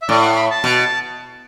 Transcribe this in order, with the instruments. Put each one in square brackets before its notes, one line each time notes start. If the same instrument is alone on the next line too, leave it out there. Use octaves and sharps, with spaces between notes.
[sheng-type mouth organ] E5
[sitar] A2 [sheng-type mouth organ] D5
[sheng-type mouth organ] F#5
B5
A5
[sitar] B2